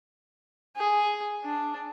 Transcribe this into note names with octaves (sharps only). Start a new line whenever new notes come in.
G#4
D4